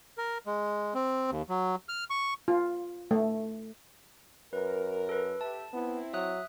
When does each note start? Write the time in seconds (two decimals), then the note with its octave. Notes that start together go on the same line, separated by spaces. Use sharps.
0.18 A#4
0.46 G#3
0.94 C4
1.31 D#2
1.49 F#3
1.89 F6
2.10 C#6
2.48 F4
3.11 A3
4.53 F#2 A#4 B4
5.09 A4 B4
5.41 G4 E5 A5
5.73 B3 C4 E4
6.14 F#3 E5 D#6 F#6